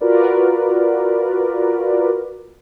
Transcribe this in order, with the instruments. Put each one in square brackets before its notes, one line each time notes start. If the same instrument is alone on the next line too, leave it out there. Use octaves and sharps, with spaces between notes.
[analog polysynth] F4 F#4 A#4 B4 D5